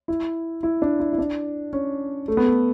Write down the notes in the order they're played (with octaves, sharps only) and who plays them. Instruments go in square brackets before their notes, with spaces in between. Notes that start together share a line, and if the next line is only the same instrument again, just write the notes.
[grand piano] E4
E4
D4
E4
E4
D4
C#4
A3
B3
A3